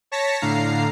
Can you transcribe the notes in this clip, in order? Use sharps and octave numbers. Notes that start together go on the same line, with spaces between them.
C#5 A5 A#6 B6 C#7
A2 D3 F5 A#5 C7